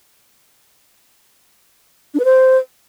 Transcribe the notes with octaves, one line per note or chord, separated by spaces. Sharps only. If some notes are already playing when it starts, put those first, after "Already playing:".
D4
B4
C5